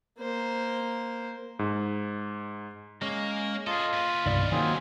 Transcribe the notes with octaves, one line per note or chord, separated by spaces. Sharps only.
A#3 C5
G#2
G#3 A#3 C#4
F4 G#4 A4 D#5
A#2 B4
C2 G2 B2 D#3 D5 F6
D#3 F#3 A#3 C4 D#4 F4 G#4